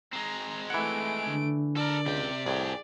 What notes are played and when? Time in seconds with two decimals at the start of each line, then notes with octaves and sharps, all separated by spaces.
0.13 G#3 C4 A#5
0.70 E3 A3 F#5 D7
1.28 D3
1.77 A4 A#4 D5
2.06 C#2 C3 G5
2.46 C2 A2 G#4 G5